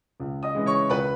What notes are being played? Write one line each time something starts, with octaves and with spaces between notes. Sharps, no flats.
C#2
D#5 D#6
C#3 E3 G#3
C#5 C#6
C#2 B4 B5